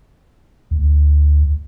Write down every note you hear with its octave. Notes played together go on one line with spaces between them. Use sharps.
D2